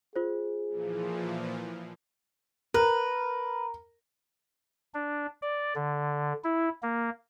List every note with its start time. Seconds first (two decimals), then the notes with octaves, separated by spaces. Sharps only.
0.16 F4 G#4 C5
0.69 A#2 E3 F3
2.74 A#4 B4
4.94 D4
5.42 D5
5.75 D3
6.44 E4
6.82 A#3